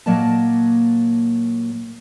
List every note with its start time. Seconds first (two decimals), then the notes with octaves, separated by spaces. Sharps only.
0.06 A#2 F#3 A#3 D5 D#5 A5